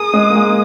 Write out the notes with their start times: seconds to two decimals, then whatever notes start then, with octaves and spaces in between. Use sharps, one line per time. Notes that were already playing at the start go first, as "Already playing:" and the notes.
Already playing: G#4 A#4 D#6
0.14 G#3
0.30 A#3
0.36 G#3